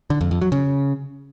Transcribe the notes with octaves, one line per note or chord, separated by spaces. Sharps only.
D3
F2
F2
F#3
C#3